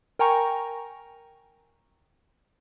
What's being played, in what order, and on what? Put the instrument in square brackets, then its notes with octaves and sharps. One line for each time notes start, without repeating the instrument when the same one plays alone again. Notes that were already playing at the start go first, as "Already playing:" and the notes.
[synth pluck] A#4 G5 G#5 A#5 C#6